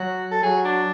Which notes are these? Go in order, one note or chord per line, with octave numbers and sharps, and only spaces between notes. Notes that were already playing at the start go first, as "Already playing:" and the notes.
Already playing: F#3 F#4
A4
F#3 G#4
D4